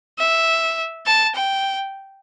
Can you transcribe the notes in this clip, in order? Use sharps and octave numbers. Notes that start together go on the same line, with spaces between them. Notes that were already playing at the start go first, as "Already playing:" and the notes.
E5
A5
G5